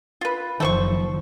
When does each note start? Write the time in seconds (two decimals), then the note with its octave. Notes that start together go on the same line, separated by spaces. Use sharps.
0.21 F4 B4
0.60 F#1 D#3 F3 A3 C5 C#6